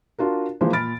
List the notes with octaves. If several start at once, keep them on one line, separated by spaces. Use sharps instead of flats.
D4 F4 F#4 A#4
E3 F3 G#3 A#3 C5
A#2 B5 F6 A6 D7